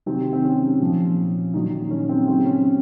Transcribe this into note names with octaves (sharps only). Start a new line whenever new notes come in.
C3 D#3 F#3 C4
C4
C#4
A#2 F3
A#2 D#3 F#3 D#4
C#4
C4
C#3 F#3 C4
C#4